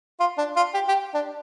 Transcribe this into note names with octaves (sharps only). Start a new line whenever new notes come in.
F4
D4
F4
G4
G4
D4